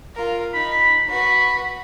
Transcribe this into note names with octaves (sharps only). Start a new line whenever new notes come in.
F4 A#4
D#4 B5
F#4 B4 B5